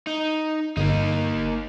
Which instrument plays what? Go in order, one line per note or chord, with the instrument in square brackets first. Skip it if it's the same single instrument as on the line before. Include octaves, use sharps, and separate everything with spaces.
[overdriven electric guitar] D#4
[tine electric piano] G1 [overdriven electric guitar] A#3 D#4